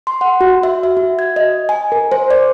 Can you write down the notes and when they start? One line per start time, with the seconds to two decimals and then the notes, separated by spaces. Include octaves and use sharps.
0.07 C6
0.21 F#5
0.41 F#4
0.63 E5
0.83 E5
0.97 F#4
1.19 G#6
1.36 D#5
1.69 G#5
1.92 A#4
2.12 C5
2.30 D5